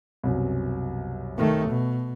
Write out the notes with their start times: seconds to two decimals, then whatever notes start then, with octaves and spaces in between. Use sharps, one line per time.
0.23 C2 F#2 B2
1.38 D#3 A3
1.69 B2